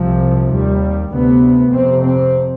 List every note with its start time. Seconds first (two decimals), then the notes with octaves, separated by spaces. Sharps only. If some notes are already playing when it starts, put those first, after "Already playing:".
Already playing: C2 C3 F3
0.51 D#2 G3
1.12 D2 C3 B3
1.72 F2 C3 C4
2.03 C4